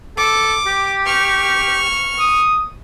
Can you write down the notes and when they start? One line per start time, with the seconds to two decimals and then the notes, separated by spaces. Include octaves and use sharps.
0.18 A4 D6
0.67 G4
1.06 C#6 F6
2.19 D#6